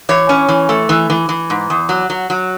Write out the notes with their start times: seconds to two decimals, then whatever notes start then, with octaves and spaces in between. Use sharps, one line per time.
0.09 E3 C#5
0.29 C#4
0.48 E3
0.69 A3
0.89 E3
1.10 E3
1.29 E3
1.50 G#2
1.70 E2
1.89 F#3
2.10 F#3
2.30 F#3